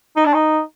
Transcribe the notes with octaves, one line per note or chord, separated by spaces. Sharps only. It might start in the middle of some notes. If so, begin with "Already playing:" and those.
D#4
D4
D#4